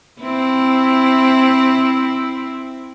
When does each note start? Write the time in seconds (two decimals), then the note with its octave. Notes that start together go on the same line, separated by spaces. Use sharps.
0.21 C4 E4